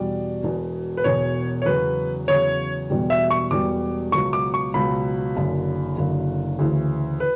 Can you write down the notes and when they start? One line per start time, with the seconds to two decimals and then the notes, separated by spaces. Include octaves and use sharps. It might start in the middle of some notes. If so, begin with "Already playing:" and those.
Already playing: E2 B2 G3 D5
0.43 E1 E2 B2
0.97 B4
1.04 E1 E2 B2 C#5
1.62 C#5
1.66 E2 C#3 F#3 B4
2.28 E2 C#3 F#3 C#5
2.90 E1 E2 B2 G3
3.10 E5
3.30 C#6
3.51 E1 E2 B2 G3 D6
4.12 C#2 B2 F#3 C#6
4.33 D6
4.54 C#6
4.74 C#2 B2 F#3 B5
5.36 F#1 F#2 D3
5.97 F#1 F#2 D3
6.59 D2 C#3 E3
7.20 B4